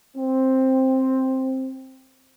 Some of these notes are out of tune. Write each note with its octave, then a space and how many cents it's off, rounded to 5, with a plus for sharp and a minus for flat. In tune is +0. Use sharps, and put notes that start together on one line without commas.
C4 +5